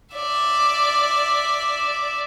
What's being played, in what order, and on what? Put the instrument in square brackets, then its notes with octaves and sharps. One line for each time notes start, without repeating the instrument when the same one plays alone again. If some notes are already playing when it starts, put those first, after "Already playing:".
[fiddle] D5 E5